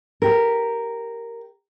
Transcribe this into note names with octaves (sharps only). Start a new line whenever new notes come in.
G4 A#4